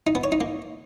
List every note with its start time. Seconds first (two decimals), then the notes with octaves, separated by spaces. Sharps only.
0.07 D#4
0.15 B3
0.24 C#5
0.32 D#4
0.41 A#3